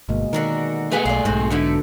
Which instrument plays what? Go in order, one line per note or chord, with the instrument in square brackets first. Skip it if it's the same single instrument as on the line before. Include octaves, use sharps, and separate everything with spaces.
[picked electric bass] G1 [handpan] B2 G#3 A#3
[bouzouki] D3 F#4 A#4 [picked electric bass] D#3
[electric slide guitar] A3 G#4 [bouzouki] B3 B4 F#5
[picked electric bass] B1 [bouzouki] D5 F5
[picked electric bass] B1 G#2 [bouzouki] C4 F#4
[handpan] B2 A4 [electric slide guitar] D3 [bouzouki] A3 D#4 E4